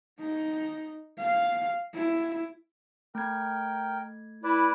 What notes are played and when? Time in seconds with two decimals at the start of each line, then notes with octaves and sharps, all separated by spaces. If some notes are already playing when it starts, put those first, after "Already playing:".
0.19 D#4
1.18 F5
1.94 E4
3.15 A3 A#4 G5 G#6
4.43 E4 B4 D5